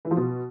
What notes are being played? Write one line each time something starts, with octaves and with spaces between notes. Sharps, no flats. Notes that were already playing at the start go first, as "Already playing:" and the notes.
E3
F3
B2